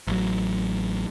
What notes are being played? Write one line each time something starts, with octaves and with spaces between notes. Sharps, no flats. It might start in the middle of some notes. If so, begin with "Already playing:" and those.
A1 F#3